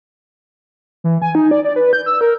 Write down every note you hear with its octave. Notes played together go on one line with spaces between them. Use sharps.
E3
G#5
D#4
D5
D5
B4
G6
E6
A#4